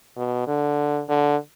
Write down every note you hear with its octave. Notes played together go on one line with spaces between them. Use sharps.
B2
D3
D3